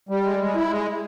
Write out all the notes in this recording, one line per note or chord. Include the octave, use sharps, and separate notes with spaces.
G3
G#3
G#3
E4
G#3